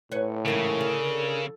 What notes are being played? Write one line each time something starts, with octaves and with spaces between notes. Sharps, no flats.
A2 B4 C#5
G#2 C#3 E3 D#4 A#4
D3